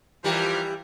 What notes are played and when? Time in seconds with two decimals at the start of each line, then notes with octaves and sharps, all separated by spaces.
0.24 E3 F3 G3 G4 A#4